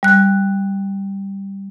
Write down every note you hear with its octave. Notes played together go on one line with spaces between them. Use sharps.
G3 F#6